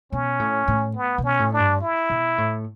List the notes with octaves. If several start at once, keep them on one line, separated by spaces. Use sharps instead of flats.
B2 C#4
A2
A2
B3
B2
C#4
A2
D4
G2
E4
B2
A2